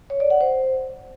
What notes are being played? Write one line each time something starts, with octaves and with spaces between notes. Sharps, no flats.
C#5
D5
F#5
C5